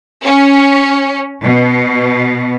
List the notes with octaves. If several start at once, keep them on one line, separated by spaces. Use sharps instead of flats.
C#4
B2